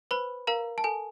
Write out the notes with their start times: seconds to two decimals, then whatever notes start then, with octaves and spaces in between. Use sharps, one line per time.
0.11 B4 C5 B5
0.47 A#4 F5 A#5
0.78 A5
0.84 A4 G#5